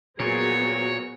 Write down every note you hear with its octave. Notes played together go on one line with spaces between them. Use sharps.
A#2 F#3 B3 C4 F#4 G#4 A#4 C#5